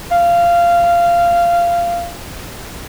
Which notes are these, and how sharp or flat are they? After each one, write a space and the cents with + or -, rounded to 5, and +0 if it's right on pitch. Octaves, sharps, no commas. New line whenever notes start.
F5 -15